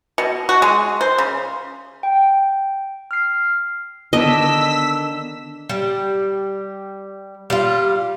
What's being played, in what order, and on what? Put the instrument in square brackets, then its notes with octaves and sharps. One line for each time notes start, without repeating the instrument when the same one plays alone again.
[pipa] B2
F#4
G#3
C5
C#3
[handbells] G5
F6 C7
[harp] D3 D#3 B3 [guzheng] D4 [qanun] D#5 [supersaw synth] E6 B6
[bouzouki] G3
G3 F4